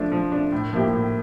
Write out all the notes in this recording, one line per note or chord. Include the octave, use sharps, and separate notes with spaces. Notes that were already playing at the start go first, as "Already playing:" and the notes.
Already playing: F3 A3 D4
F3
A3 D4
A2
F3 A#3 E4 G4
A2